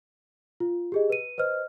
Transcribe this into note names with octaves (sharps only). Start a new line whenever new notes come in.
F4
G4 G#4 D#5
B4 D#7
B4 C5 D#5 F6